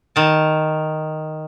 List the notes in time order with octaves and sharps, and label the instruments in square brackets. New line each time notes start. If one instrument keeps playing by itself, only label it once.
[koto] D#3 A5